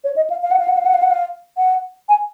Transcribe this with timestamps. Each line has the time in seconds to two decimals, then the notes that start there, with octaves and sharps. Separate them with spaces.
0.04 C#5
0.16 D#5
0.30 F5
0.43 F5
0.51 F#5
0.59 F5
0.68 F#5
0.77 F5
0.86 F#5
0.94 F5
1.03 F#5
1.11 F5
1.58 F#5
2.09 G#5